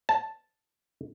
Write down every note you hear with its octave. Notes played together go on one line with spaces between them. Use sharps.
A5